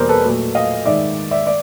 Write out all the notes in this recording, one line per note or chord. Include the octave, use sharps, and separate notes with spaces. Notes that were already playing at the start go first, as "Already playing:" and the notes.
Already playing: E2 B2 G3 A#3 A#4 C5
A4 B4
A#2 F#3 A3
D#5 F5
G#2 D#3 G#3 D5 E5
D5 E5
D5